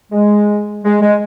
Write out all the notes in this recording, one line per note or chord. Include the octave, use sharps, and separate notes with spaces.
G#3
G#3
G#3